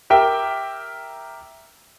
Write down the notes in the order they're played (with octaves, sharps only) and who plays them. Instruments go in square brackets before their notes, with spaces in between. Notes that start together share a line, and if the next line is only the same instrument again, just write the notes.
[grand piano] G4 A#4 E5 G5